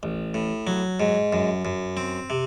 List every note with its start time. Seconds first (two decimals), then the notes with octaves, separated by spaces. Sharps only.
0.03 A1
0.34 A2
0.67 F#3
1.00 G#2
1.33 F#2
1.65 F#2
1.97 C4
2.30 C3